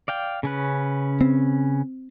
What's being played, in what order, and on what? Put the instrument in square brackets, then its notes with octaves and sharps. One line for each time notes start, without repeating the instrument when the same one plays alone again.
[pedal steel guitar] D5 F5 G5
C#3 C#4 B4
[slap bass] C4